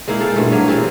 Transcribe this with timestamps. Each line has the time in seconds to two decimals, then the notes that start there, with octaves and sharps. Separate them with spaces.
0.08 G#3 A#3 D#4 E4
0.20 F4 A4 C5 G5
0.36 G2 B2 E3 A3
0.52 F#3 A#3 E4 G#4
0.68 E3 C4 F4 G4